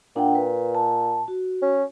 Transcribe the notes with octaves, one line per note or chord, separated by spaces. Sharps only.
A#2 D4 F#5 G5
B4
A5
F#4
C#4